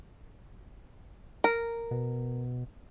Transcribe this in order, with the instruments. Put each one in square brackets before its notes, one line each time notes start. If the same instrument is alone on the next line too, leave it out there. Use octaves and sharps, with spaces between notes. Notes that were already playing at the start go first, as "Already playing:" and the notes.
[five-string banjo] A#4
[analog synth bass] B2